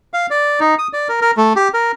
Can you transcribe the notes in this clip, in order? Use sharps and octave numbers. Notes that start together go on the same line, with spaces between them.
F5
D5
D#4
D#6
D5
A#4
A#4
A3
G4
A#4